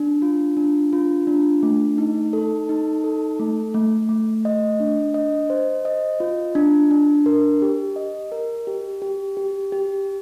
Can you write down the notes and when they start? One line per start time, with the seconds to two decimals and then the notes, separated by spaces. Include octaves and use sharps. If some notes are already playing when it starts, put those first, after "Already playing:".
Already playing: D4
0.22 F4
0.57 D4
0.93 F4
1.27 D4
1.63 A3
1.98 D#4
2.33 A4
2.69 D#4
3.04 A4
3.40 A3
3.74 A3
4.09 A3
4.45 D#5
4.80 D4
5.14 D#5
5.50 C5
5.85 D#5
6.20 F4
6.55 D4
6.91 D4
7.26 A#4
7.62 G4
7.96 D#5
8.32 A#4
8.67 G4
9.02 G4
9.37 G4
9.72 G4